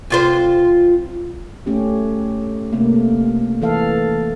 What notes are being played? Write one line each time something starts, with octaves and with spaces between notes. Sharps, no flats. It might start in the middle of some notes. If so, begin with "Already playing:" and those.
C3 F4 C5
A3 C#4 G4
C3 A3 A#3
E3 A4 F5